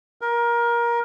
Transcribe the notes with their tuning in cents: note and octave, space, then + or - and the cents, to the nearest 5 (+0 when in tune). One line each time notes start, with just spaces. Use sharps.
A#4 +20